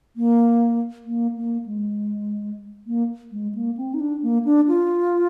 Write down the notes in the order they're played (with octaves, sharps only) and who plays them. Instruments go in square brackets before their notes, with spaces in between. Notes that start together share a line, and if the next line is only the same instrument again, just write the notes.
[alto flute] A#3
A#3
A#3
G#3
A#3
G#3
A#3
C4
D#4
D4
A#3
D4
F4